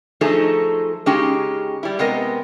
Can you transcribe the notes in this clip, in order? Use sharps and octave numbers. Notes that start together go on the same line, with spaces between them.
F3 F#3 A3 D#4 G#4 A4
C#3 G#3 C#4 D#4 F#4 G4
G3 E4
C3 G#3 B3 A#4 D#5